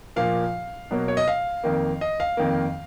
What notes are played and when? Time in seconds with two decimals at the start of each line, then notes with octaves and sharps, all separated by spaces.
0.16 A#2 F3 A#3 F5
0.91 B2 F#3 A#3
1.08 C#5
1.17 D#5
1.28 F5
1.64 F2 D#3 A#3
2.01 D#5
2.20 F5
2.37 F2 D#3 A#3